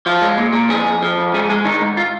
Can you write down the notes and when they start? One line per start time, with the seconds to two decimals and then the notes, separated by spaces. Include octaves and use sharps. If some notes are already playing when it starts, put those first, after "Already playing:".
0.06 F3 F4
0.22 G#3
0.38 A#2
0.53 A#2
0.69 F2 G#4
0.85 F2
1.02 F3
1.18 F2
1.34 G#2 G#4
1.49 G#3 G#4
1.65 D#3 D#4
1.82 G#2
1.97 F4